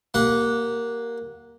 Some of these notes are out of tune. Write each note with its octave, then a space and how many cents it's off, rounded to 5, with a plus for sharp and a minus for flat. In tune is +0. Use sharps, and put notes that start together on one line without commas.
A#3 +0 G4 -15 F#5 -15